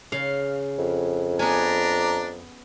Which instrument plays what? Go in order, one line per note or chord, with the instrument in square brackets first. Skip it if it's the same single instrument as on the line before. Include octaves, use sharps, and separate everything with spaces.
[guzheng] C#3 F5
[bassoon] F2
[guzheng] B3 G#5 [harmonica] D4 A#5